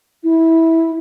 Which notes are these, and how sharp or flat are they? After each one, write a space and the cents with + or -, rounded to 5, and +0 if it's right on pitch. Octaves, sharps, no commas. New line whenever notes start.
E4 -15